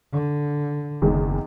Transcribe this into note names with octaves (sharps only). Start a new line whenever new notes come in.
D3
F#1 E2 D#3 G#3